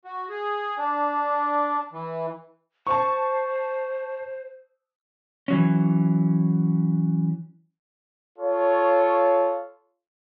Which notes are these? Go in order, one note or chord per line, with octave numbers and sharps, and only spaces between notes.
F#4
G#4
D4
E3
C5 A5 C#6
E3 F#3 C#4
F4 A4 C#5